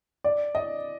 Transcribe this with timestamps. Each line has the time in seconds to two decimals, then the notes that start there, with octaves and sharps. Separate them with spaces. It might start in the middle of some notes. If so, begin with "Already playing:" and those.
0.24 D5
0.55 D#5